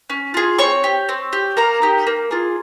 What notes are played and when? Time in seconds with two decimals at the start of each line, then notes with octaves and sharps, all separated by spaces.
0.10 C#4
0.34 F4 G#4
0.59 C4 C#5 C#6
0.84 G4
1.09 C4
1.33 G4
1.57 A#3 A#4 A#5
1.82 D#4 G4
2.07 A#3
2.31 F4 G#4